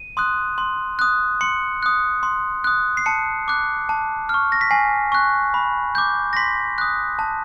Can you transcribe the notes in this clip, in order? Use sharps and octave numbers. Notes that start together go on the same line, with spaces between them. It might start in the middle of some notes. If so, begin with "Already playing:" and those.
Already playing: D#7
C6 D#6 F#6
C6
D#6 F#6
C6 C#7
D#6 F#6
C6
D#6 F#6
C7
A5 C#7
D6 F#6
A5
C#6 F6
A#6
B6
G#5 C7
C#6 F#6
B5
D6 G6
A#6
C6 B6
D#6 F#6
A5